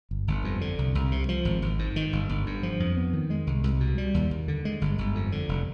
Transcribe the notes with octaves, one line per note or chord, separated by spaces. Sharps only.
G1
G1
F2
D3
C2
C2
C3
F3
G#1
G#1
G#2
D#3
G1
G1
G2
F3
F2
B3
D#3
G#3
C2
C2
B2
G3
D#2
D#2
D3
G#3
G1
G1
F2
D3
F1